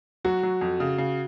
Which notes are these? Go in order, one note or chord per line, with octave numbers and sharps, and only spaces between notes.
F#3 F#4
F#3
F2
C#3
C#3